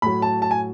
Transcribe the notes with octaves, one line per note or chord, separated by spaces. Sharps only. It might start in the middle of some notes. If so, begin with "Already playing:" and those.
A2 F#3 B5
A5
A5
G#5